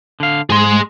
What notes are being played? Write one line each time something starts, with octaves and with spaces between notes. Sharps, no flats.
D3 F5
G#2 G#4 C6